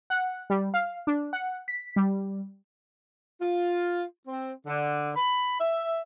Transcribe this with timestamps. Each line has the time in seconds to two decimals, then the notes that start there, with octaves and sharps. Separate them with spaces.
0.10 F#5
0.50 G3
0.74 F5
1.07 D4
1.33 F#5
1.68 B6
1.96 G3
3.40 F4
4.27 C4
4.66 D3
5.15 B5
5.59 E5